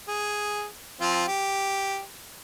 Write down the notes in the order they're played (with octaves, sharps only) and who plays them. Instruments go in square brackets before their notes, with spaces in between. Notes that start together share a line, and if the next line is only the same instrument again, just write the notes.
[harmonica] G#4
F3 C4 F4
G4